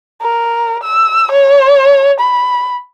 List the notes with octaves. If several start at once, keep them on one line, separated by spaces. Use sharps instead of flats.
A#4
E6
C#5
B5